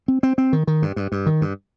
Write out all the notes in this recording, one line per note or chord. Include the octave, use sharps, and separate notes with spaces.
C4
C4
C4
D#3
D#3
G2
G2
G2
D#3
G2